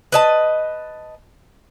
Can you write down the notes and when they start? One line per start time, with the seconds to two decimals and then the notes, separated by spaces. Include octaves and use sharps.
0.12 B4 D#5 A5